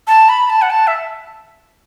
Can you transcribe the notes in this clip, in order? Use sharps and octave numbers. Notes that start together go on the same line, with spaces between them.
A5
B5
A5
F#5
A5
E5